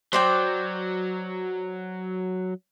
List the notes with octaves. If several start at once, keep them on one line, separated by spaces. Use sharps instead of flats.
F#3 C5 D5 G5